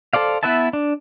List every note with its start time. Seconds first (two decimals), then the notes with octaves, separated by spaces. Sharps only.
0.13 A4 C5 D5 F5
0.43 B3 E4 B4 E5 A5
0.73 D4